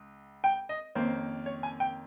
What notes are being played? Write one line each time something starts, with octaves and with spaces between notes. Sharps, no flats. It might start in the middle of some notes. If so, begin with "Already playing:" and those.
Already playing: C#2
G5
D#5
F2 D#3 A#3 C#4 C5
C#5
G#5
G5